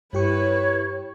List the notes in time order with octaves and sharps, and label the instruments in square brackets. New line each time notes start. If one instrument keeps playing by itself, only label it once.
[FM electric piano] G2 G4 C#6 [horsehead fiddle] E4 B4 [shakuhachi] C#5